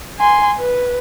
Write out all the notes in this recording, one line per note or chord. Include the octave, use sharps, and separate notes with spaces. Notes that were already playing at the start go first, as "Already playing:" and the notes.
G#5 C6
B4